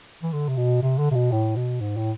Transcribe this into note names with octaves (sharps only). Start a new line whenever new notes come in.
E3
D3
C3
B2
C3
D3
C3
B2
A2
B2
G#2
A2